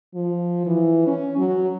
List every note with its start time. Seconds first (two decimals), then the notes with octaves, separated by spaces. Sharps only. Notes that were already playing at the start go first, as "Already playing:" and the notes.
0.14 F3
0.67 E3
1.07 C#4
1.38 F#3